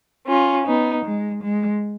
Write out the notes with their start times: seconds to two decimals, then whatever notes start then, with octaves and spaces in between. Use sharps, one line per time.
0.28 C#4 F4
0.66 B3 D#4
1.03 G#3
1.41 G#3